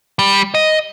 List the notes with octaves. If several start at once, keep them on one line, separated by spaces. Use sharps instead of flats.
G3
D#5